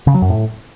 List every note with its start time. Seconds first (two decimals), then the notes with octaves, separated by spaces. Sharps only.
0.07 C#3
0.14 F#3
0.22 F#2
0.30 A2